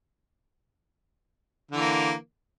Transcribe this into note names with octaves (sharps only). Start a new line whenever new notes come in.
D3 E3 A#3